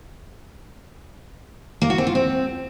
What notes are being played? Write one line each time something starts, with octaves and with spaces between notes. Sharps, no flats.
A#3
F#4
C4
F4
C4